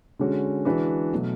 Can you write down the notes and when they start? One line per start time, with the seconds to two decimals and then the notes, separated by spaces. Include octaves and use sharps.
0.19 D3 G#3 C#4 F#4
0.65 E3 G#3 D4 F#4 B4
1.13 B2 F#3 A3